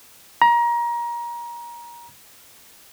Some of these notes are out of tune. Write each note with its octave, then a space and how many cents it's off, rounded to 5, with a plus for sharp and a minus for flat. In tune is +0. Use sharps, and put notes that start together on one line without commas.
A#5 +25